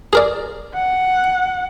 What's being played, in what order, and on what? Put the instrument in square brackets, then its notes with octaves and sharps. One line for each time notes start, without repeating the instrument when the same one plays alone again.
[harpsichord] G#4 A#4 D5
[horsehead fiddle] F#5